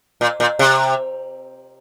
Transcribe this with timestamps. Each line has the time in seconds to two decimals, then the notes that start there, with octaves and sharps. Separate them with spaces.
0.21 A#2
0.40 A#2
0.59 C3